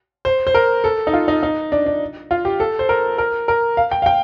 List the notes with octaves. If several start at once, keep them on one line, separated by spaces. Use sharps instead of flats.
C5
C5
A#4
A4
D#4
F4
D#4
D#4
D4
D4
F4
G4
A4
C5
A#4
A#4
A#4
F5
G5
F5
G5